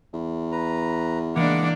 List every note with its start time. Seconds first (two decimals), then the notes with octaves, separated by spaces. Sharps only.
0.13 E2
0.52 B4 A#5
1.36 E3 G#3 A#3 D4 F#5 D6